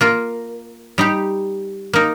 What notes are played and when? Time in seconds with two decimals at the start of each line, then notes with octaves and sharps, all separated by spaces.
0.01 A#3 F4 A#4
0.98 G3 D#4 G4
1.93 A#3 D#4 A#4